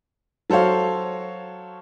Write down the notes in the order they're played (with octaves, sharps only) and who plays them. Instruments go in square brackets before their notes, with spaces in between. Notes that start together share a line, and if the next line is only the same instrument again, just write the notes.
[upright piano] F#3 A4 C5 C#5 F5